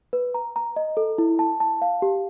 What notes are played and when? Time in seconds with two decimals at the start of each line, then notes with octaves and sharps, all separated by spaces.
0.13 B4
0.34 A#5
0.56 A#5
0.76 D#5
0.97 A4
1.18 E4
1.39 A5
1.60 A5
1.82 F5
2.02 G4